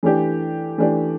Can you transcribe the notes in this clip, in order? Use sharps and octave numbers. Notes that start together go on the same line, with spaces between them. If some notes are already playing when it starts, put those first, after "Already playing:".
E3 A3 D4 G4
E3 A3 D4 G4